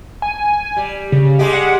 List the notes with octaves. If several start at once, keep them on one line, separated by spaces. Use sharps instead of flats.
G#5
G3
C#3
G3 G#3 G4
F#5